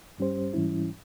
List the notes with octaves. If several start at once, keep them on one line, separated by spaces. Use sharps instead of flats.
G2 G3 C#4 G4 C5
G#2 E3 G3 C#4 E4